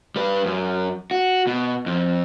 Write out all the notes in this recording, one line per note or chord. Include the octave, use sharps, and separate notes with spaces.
G3 B4
F#2
F#4
B2
F2